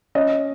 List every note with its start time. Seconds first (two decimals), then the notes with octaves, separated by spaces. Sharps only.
0.15 C#4 D#5